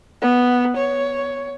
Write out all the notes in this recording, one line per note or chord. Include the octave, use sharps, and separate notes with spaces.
B3
C#5